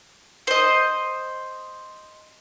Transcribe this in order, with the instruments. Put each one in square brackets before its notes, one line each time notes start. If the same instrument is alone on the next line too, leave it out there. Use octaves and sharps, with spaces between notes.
[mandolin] C5 D#5